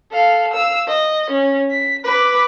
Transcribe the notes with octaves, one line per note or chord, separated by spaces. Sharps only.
A4 F5
F5 E6
D#5
C#4
B6
B4 D6